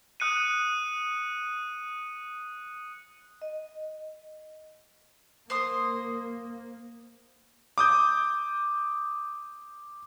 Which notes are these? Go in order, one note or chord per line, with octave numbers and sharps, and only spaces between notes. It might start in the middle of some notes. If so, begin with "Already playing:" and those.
D#6 F#6 C#7 D#7
D#5
A#3 C5 C6 D#6
D6 D#6 G6